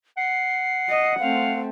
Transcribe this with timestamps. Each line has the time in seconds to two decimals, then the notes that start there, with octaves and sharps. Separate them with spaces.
0.17 F#5 C7
0.89 D#5
1.20 A3 C4 F5